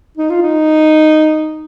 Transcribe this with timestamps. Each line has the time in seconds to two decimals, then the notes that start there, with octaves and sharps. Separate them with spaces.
0.17 D#4
0.30 F4
0.42 D#4